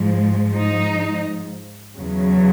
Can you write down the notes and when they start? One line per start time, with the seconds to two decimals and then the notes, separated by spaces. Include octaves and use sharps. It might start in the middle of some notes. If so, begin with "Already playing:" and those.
Already playing: G#2 F3
0.56 D#4
1.96 E2 C#3 F#3